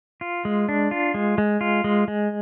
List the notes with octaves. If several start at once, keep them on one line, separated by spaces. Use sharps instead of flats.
F4
G#3
D4
F4
G#3
G#3
F4
G#3
G#3